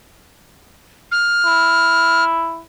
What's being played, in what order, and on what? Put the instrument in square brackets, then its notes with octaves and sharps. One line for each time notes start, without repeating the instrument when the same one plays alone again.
[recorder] F6
[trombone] E4